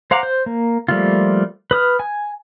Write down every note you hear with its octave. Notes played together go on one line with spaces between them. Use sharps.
C5 F5 F#5 A#5 D6
C5
A#3
F3 G3 A3 A#3 F4
B4 D#6 F6
G#5